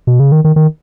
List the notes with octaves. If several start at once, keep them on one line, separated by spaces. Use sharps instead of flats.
B2
C#3
D#3
D#3
D#3